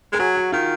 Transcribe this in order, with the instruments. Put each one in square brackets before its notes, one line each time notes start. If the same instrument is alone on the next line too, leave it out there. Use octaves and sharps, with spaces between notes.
[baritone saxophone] G#3 [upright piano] A#4
[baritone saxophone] F#3 [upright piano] G#4
[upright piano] F#4
[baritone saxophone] D#3 [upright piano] F4